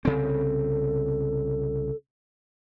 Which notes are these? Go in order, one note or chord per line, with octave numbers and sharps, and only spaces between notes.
C2 C#3 C4 A4